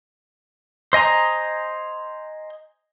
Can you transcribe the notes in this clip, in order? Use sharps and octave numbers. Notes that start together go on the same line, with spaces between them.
C5 D#5 G#5 A#5